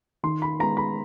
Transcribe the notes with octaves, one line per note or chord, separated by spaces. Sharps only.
D#3 C6
B5
G#3 B3 A#5
B5